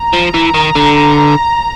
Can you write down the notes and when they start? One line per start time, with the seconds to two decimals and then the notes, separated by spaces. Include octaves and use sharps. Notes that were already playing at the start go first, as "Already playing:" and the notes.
Already playing: A#5
0.13 F3
0.34 E3
0.54 D#3
0.75 D3